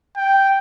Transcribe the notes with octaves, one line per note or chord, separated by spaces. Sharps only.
G5